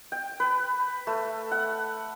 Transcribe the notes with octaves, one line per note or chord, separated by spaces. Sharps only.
G5
B4
A3
F#5